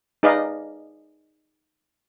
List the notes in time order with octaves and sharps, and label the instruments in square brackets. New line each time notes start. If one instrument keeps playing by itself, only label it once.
[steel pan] D#4 G#4 B4 D5 D#5 F5